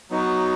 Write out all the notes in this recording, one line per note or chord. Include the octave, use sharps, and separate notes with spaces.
F#3 B3 D#4 F#4